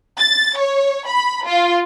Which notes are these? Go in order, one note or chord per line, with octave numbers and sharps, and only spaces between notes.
A6
C#5
B5
F4